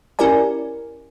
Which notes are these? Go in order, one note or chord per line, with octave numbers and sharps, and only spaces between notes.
C#4 E4 G4 A#4 D5 G#5